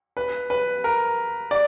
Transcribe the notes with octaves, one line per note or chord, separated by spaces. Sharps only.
B4
B4
A#4
D5